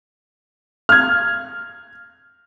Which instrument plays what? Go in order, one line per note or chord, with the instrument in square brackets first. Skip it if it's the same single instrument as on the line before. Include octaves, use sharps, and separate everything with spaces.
[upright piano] F6 G#6